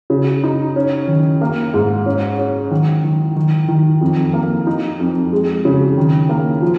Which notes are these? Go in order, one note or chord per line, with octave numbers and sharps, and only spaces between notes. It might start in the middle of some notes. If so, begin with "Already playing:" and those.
C#3
D#4
C#4
D#3
A#3
G#2
C#4
C#4
D#3
D#3
D#3
D#3
F2
A#3
D#4
F2
G#3
C#3
D#3
A#3
F3